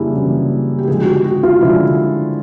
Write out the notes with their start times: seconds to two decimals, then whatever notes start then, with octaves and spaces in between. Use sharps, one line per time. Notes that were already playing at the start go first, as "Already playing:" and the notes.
Already playing: F#2 C#3 E3 G3 A#3 D4 E4 G#4
0.15 F#2 C#3 E3 G3 A#3
0.79 G4
0.88 D3 F3 G#3 G#4
1.02 F#4
1.06 G4
1.24 F#4
1.43 F4
1.61 D3 F3 G#3 E4